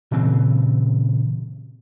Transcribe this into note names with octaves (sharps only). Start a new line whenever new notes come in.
A#2 C#3 E3 C4